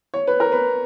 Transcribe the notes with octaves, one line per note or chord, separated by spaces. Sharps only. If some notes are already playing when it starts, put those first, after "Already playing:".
C#5
B4
A#4
B4